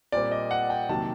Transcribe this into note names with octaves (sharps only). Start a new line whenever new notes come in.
A#2 G3 C4 D5
D#5
F#5
G5
C3 D#3 F#3 A#3 A5